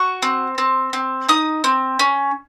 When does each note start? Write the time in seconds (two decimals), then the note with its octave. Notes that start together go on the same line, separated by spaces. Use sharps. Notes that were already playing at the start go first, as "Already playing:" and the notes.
Already playing: F#4 C#6
0.22 C4
0.58 C4
0.93 C4
1.29 D#4 D#6
1.64 C4
1.99 C#4